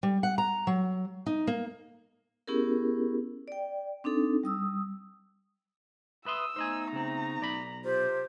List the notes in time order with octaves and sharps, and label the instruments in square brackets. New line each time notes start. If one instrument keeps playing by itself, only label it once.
[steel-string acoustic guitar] G3
F#5
A#5
F#3
D#4
A#3
[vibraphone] B3 C#4 E4 G4 G#4 A#4
D5 G5
C4 D4 D#4 A4
G3 D#6 E6
[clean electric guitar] B4 E5 C6 [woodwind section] D#6 [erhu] E6
[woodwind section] A3 B3 D#4 [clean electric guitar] C5 D#5 G#5
[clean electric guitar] C#3 C4 [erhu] A#5
[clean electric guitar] B1 D5 B5
[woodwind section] C3 F4 G4 [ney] C5